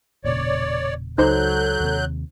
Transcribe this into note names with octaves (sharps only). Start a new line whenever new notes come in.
E1 A#2 C#3 C#5 D5
C#2 F#3 D#4 A4 C5 F#6 G6
D#2 C3